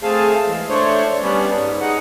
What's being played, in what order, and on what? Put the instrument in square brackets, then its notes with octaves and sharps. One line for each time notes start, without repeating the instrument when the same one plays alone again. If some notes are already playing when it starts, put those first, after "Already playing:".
[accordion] A3 C4 G#4 F5 A5
E3 G#3
A3 D4 C5 C#5
G3 B3 C#4 D4
G#2
G#3 D#4 F#5